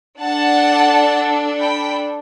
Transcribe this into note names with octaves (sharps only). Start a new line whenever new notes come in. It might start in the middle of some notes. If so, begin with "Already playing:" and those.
D4 A4 F#5 A5
G5 B5